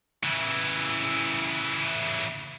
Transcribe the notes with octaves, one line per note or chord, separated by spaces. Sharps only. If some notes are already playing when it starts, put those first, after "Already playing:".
C#3 E3